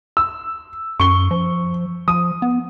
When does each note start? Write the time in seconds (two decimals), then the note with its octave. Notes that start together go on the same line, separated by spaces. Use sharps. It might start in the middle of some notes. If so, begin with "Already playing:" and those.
0.17 E6
1.00 F#2 C#6 G7
1.31 F3
2.08 F3 D#6
2.42 B3